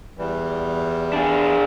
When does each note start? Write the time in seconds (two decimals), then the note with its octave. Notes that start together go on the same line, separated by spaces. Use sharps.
0.18 E2 E3 G3
1.13 D4 G#4